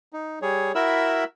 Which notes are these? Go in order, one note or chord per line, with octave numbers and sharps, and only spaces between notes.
D#4
G3 G#4 C#5
E4 F#4 A#4 E5 B5 E6